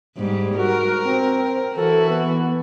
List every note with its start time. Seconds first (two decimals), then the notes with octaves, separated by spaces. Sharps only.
0.17 G#2 G3
0.56 F#4 A#4
1.03 C4
1.75 E3 F#4 A4
2.09 B3